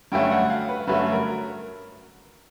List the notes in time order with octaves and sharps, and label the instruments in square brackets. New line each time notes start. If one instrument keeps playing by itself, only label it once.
[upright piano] G2 D3 F#3 A3 C#4 G5
F#5
F5
B4
G2 D3 F#3 A3 C#4 B4
A#4